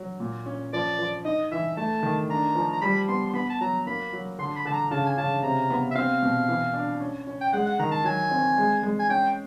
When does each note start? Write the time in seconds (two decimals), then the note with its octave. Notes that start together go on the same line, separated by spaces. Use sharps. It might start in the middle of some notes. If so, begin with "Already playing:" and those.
Already playing: F#3
0.20 A#2
0.46 C#4
0.73 F3 D5
0.99 F3
1.25 D#4 D#5
1.51 E3 E5
1.77 A3 A5
2.03 D#3
2.29 D4 A#5
2.55 F3
2.72 A#5
2.81 G3 B5
3.08 B3 C6
3.27 C6
3.34 B3 B5
3.50 A5
3.61 F#3 A#5
3.87 A#3 B5
4.13 F#3
4.39 D3 C6
4.56 B5
4.65 D3 A5
4.73 A#5
4.91 C#3 A5
5.06 G#5
5.18 C#3 A5
5.43 C3 A#5
5.70 B3
5.91 E5
5.95 C4 F5
6.23 B2
6.49 E3
6.74 D4
7.00 C#4
7.27 C#4
7.41 G5
7.53 G#3 F#5
7.66 F#5
7.79 D#3 A#5
7.91 A5
8.04 F#3 G#5
8.31 C4
8.58 G#3
8.83 G#3
8.99 G#5
9.09 C#4 G5